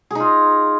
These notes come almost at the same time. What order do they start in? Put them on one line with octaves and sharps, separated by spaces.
G#4 D#4 F4